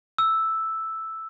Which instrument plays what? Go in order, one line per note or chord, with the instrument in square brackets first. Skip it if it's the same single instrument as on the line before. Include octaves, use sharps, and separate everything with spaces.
[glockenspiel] E6